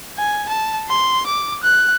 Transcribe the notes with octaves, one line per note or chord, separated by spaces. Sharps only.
G#5
A5
C6
D6
F#6